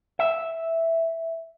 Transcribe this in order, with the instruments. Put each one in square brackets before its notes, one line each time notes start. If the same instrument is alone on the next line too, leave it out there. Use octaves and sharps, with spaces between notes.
[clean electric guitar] E5